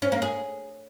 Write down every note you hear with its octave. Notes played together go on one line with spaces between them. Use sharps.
C#4
A#3
G#4